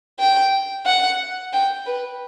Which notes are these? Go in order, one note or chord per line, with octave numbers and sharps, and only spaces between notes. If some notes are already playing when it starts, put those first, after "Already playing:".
G5
F#5
G5
B4